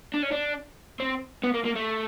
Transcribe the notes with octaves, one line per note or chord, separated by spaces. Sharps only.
D4
C#4
D4
C4
B3
A#3
A#3
A3